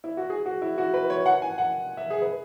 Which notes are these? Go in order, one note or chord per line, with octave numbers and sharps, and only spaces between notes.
E4
F#4
G#4
F#4
E4
F#4
B4
C#5
F#5
G#5
F#5
E5
G#4
B4